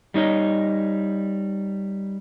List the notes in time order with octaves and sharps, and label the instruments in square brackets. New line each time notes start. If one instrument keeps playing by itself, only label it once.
[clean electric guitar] G3 D#4 C#5 D#5